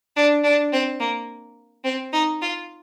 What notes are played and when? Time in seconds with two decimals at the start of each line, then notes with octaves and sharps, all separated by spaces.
0.16 D4
0.44 D4
0.72 C4
1.00 A#3
1.84 C4
2.13 D#4
2.42 F4